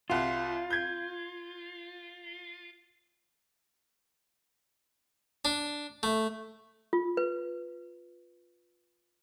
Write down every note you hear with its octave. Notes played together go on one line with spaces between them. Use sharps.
C2 F4 F#4
G6 G#6
D4
A3
F4
B4